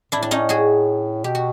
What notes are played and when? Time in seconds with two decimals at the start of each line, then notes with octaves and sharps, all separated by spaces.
0.12 A2 D4 E4
0.23 D4
0.31 C#4 D#4
0.49 F#4 G#4
1.24 B2 G4
1.35 F#4